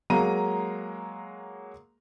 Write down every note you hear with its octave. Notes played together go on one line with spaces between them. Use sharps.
F#3 G#3 A#3 A#5 D#7